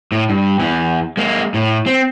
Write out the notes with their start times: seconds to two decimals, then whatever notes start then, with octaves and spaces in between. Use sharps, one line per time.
0.12 A2
0.29 G2
0.59 E2 E3
1.17 G#3 A#3
1.54 A2
1.86 C4